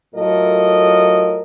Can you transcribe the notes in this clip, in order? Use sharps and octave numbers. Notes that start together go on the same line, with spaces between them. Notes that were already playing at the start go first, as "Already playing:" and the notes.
A2 F#3 F4 A4 A#4 D#5